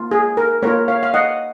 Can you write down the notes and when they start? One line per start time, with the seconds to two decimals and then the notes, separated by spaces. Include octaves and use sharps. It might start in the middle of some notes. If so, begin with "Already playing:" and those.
Already playing: A#3 F4
0.11 G#4
0.37 A#4
0.62 A#3 F4 A#4 C#5
0.88 C#5 F5
1.03 F5
1.14 D#5 F#5